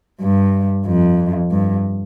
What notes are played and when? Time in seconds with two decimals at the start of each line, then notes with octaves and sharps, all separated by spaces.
0.21 G2
0.86 F2
1.51 G2